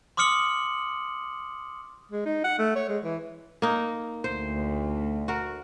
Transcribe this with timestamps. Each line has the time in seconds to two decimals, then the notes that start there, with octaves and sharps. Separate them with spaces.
0.17 C6 D6 D#6 F6 C#7 F#7
2.12 G#3
2.26 D#4
2.44 F#5
2.59 A3
2.76 C#5
2.89 G#3
3.04 E3
3.62 A#3 D#4
4.24 D2 C5
5.28 F#4 A#4